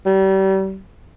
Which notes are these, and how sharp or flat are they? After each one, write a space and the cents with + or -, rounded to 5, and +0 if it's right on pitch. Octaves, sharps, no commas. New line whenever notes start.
G3 -35